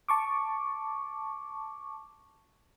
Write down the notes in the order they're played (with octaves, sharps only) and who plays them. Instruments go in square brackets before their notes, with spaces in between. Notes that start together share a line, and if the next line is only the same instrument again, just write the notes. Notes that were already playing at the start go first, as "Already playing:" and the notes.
[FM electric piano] A5 C#6 D6